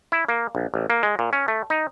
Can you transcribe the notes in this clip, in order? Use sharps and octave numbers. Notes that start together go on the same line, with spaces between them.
E4
A#3
A#1
A1
A#3
G#3
A#2
C#4
A3
D#4